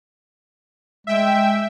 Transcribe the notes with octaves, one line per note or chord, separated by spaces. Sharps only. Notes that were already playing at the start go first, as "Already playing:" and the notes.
G#3 E5 G5